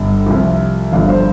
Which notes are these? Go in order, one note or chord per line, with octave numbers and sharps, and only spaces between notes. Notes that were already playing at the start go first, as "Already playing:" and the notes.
Already playing: G1 G2 G3
C2 C3 F3
G1 G2 F3 F5
C5